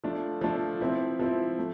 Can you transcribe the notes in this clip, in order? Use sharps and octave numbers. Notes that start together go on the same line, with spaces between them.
F3 A3 D4 F4
F3 A3 D4 F4
F3 C4 E4
F3 C4 E4
A3